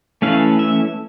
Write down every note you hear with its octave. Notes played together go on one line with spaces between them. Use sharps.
E3 A3 C#4 E4 F5
E5